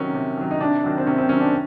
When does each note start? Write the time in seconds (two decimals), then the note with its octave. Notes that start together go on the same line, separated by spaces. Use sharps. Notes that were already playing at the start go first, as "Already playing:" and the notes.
Already playing: C3 D#3 F#3 C#4
0.14 C3
0.38 D#3 F#3
0.51 D#4
0.60 C3 D4
0.84 D#3 F#3
0.98 C4
1.07 C3 C#4
1.18 C4
1.29 D#3 F#3 C#4
1.40 D4